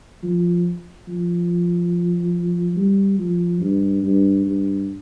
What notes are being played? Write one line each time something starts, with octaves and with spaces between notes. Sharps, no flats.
F3
F3
G3
F3
G2
G2
G2